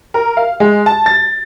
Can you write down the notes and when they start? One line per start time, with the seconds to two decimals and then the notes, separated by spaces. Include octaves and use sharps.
0.14 A#4
0.37 F5
0.60 G#3
0.86 A5
1.06 A6